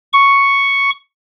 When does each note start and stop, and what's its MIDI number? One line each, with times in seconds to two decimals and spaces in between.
0.13 0.90 85